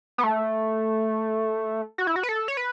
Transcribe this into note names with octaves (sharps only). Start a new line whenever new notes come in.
B3
A3
F#4
E4
F#4
B4
A4
C#5
B4